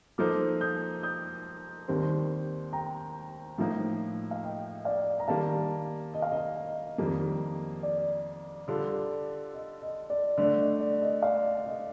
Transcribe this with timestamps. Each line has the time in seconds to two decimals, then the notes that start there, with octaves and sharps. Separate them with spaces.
0.18 F3 A#3 D#4 A4 C5 D6 F6
0.61 D#6 G6
1.03 D#6 G6
1.88 D#2 D#3 G3 C4
2.73 G5 A#5
3.58 A2 F3 A#3 D#4
4.31 F5
4.43 D#5 G5
4.85 D5 F5
5.20 A#5
5.28 D#3 G3 A#3 F5 A5
6.14 D#5
6.22 F5
6.32 D#5
6.98 F2 D#3 G3 A#3
7.83 D5
8.68 D3 G3 D4 F4 A4
9.54 D#5
9.82 D#5
10.10 D5
10.38 D3 A3 D4 D5
10.59 D#5
10.80 D5
11.02 D#5
11.22 D5 F5
11.66 D#5